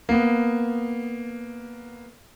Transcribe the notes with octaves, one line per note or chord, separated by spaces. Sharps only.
A#3 B3